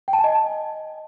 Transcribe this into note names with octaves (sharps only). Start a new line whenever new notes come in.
G5
A5
G#5
D#5